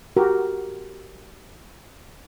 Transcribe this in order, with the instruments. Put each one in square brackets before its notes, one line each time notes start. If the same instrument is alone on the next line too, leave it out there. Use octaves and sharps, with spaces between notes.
[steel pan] F#4 G4 A#4